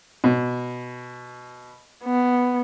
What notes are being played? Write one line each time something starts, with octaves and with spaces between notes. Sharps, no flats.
B2
B3